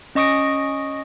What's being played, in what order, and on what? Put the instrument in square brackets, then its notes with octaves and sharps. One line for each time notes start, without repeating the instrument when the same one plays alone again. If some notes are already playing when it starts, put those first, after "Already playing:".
[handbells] C#4 D#5 C#6 D#6 A#6 D7